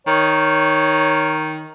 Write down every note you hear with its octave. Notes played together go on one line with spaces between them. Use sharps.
D#3 C#5